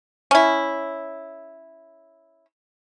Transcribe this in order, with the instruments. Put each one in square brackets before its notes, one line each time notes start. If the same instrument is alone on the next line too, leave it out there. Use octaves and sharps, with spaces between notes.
[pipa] C#4 E4